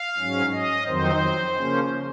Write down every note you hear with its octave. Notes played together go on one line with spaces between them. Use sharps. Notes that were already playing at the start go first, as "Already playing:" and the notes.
Already playing: F5
G#2 F#3 C#4
D#5
F2 D#3 F#3 C4 D#4 C5
C#3 F3 A#3 C#4